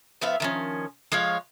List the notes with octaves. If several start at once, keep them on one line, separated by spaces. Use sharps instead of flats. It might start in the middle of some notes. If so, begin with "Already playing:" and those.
F3 B3 E5 F5
D#3 F3 C#4
F3 G#3 C#5 F5